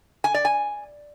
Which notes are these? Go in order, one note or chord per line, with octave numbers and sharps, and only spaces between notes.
G#5
D5
G#5